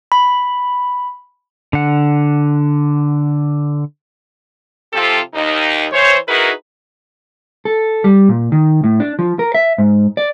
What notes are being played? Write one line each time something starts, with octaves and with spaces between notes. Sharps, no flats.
B5
D3 F#5
C3 F3 C4 F4 G4 A4
D#2 D#4
E3 C5 C#5
D#4 E4 F#4 G#4 A#4 B4
A4
G3
A#2
D#3
A2
D4
F3
A#4
E5
G#2
D5